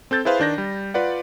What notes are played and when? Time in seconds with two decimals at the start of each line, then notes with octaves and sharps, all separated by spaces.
0.11 C4 A4 G6 A6
0.25 E4 G#4 B4 C5 F5
0.40 D#3 D4 G6 A#6
0.58 G3
0.94 F4 B4 D5 F#5